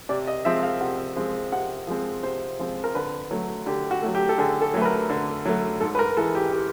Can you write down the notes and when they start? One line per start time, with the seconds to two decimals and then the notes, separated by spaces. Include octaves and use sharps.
0.09 C3 D5
0.27 D#5
0.45 F3 G#3 C4 E5
0.63 F5
0.81 C3 F#5
1.16 F3 G#3 C4
1.52 C3 F#5
1.87 F3 G#3 C4
2.23 C3 C5
2.59 F3 G#3 C4
2.84 A#4
2.95 D3 B4
3.31 F#3 A3
3.66 D3 G4
3.91 F#4
4.02 F#3 A3
4.15 G4
4.29 A4
4.38 D3 G#4
4.62 A4
4.74 F#3 A3
4.82 B4
4.85 A#4
5.10 D3
5.45 F#3 A3
5.81 G#2 A4
5.95 B4
5.99 A#4
6.17 E3 G#3 A4
6.35 G4
6.52 G4